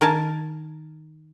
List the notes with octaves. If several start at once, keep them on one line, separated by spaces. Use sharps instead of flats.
D#3 A#4 G#5 A5